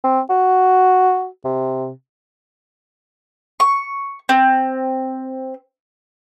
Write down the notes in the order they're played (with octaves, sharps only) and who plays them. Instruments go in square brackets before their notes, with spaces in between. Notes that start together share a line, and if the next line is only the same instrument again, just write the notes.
[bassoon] C4
F#4
C3
[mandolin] C#6
C4